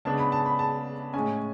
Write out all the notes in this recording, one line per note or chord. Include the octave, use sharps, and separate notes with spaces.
C#3 G#3 B3 D4 A5
B5
A5
B5
A5
A2 G#3 C#4 G#5